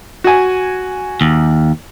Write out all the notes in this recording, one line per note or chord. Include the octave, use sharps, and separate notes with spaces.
F#4 G#5
D#2